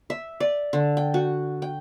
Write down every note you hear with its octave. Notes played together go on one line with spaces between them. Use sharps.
E5
D5
D3
G5
F#4
G5